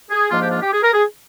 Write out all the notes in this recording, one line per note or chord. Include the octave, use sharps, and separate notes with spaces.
G#4
G#2 F3 A#3 D4 F4
G4
F4
G4
G#4
A#4
G#4